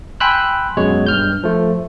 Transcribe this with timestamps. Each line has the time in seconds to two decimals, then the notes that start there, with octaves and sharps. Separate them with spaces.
0.20 G5 G#5 B5 C6 E6 F#6
0.77 F#2 B2 G#3 C#5
1.07 G2 F6 G6
1.43 F3 A3